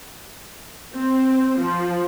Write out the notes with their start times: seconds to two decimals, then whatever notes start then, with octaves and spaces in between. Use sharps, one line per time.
0.95 C4
1.58 F3